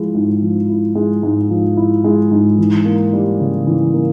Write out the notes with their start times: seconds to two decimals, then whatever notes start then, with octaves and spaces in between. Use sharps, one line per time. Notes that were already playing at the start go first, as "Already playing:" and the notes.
Already playing: F3 G#3 E4
0.15 G#2
0.42 F3
0.69 E4
0.95 G#3
1.23 G#2
1.50 F3
1.77 E4
2.04 G#3
2.31 G#2
2.58 E3
2.85 A#3
3.13 G3
3.40 C#3
3.67 E3
3.94 A#3